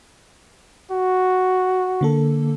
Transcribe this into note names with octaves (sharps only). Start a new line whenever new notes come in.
F#4
D3 A#3 A4